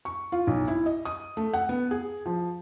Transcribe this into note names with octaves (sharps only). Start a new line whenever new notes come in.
C#6
F4
B1
E4
D#5
D#6
A3
F#5
B3
G#4
F3